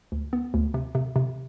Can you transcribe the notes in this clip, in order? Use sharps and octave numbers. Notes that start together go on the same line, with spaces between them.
D2
B3
D2
C3
C3
C3